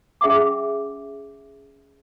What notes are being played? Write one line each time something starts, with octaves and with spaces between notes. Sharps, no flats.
C#4 G#4 E5 F#5 D6